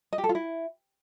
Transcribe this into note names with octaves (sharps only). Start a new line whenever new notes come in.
D#5
G4
A4
F4
E4